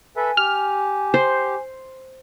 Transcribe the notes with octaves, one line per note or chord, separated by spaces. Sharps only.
A4 B4 E5 G#5
G4 F6
C5